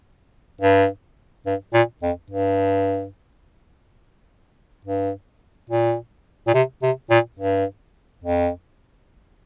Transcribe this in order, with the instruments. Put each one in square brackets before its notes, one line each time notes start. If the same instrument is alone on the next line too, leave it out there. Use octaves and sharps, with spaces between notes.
[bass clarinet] G2
G2
A#2
F2
G2
G2
A#2
A#2
C3
C3
A#2
G2
F2